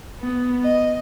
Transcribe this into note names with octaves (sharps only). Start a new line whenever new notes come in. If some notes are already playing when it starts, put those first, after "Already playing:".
B3
D#5